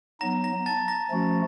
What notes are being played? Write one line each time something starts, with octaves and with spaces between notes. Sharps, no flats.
F#3 B3 D#4 A#5 A#6
A#5 A#6
A5 A6
A#5 A#6
F3 A3 C#4 F#4